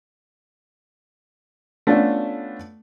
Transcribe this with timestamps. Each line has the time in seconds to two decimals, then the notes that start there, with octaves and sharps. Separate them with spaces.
1.87 A3 B3 C#4 D4 F4 A4